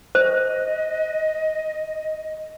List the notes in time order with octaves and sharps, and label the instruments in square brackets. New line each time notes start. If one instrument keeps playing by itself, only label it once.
[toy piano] C5 [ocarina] D#5